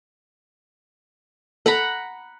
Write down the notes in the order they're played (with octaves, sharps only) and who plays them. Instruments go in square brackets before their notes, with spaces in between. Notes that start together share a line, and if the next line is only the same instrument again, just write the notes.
[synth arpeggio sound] A4 [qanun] F#5 A#5 B5